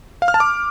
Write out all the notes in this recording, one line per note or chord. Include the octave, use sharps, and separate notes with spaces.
F5
F6
A5
D6